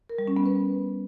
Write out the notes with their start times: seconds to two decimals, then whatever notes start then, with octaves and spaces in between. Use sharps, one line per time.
0.09 A#4
0.19 G3
0.28 C#4
0.37 B3
0.46 B4